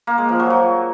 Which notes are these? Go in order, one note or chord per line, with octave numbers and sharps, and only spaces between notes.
A#3
G#3
F3
F#3
F#3